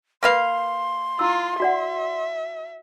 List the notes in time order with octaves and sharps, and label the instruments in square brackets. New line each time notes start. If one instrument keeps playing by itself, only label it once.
[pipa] A#3 B4 F5 [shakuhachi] C6
[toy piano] E4 E6 [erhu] F4
[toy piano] F#4 D5 F#5 [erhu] E5